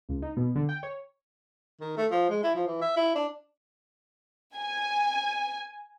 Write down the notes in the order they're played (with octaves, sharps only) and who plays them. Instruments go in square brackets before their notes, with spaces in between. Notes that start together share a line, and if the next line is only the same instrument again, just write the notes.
[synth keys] C#2
D#4
B2
D3
G5
C#5
[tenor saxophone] D#3
A3
F3
G#3
E4
F3
E3
E5
E4
D4
[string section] G#5